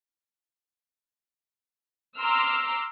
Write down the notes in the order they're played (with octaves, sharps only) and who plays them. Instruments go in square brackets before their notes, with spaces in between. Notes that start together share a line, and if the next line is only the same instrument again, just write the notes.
[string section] A#5 C6 D6 E6 F6